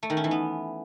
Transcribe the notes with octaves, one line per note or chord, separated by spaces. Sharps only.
A3
D#3
C#4
E3
B3